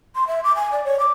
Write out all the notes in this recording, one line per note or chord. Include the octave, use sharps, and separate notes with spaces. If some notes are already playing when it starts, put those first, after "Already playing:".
C6
E5
D6
G#5
D5
C#5
D6